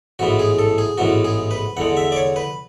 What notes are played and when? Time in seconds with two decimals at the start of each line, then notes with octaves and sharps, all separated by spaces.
0.19 A1 G#2 E3 B3 F#4
0.39 G#4
0.59 A4
0.78 G#4
0.98 A1 G#2 E3 B3 F#4
1.25 G#4
1.51 B4
1.77 E2 D3 G#3 F#5
1.97 E5
2.12 D5
2.16 C#5
2.36 B4